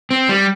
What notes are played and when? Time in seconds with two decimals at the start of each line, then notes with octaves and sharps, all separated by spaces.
0.11 C4
0.29 G3